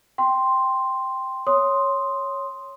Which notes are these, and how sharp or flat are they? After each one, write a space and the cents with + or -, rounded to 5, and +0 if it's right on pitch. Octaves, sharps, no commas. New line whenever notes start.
G5 +0 C6 +0
C#5 +0 C6 +0 D#6 +0